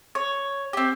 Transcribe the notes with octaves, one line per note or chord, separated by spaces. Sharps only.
C#5
C4 G4